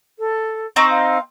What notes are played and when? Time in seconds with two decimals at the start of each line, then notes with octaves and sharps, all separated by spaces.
0.18 A4
0.76 C4 D#4 C5 C#6
0.90 F5